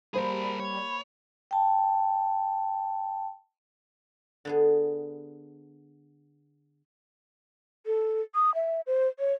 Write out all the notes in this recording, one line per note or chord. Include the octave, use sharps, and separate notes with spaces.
G3 A#3 G#4 A#4 C5 B5
C#5
G5 A5
D3 B3 G#4
A4
D#6
E5
C5
C#5